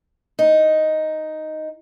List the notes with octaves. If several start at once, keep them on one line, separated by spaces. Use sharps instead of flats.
D#4